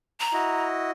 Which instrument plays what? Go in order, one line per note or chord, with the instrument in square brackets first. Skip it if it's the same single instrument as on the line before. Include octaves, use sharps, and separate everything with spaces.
[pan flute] A#5
[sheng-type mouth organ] E4 F#4 D#5